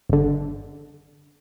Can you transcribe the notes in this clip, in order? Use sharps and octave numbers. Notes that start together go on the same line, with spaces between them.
G1 D3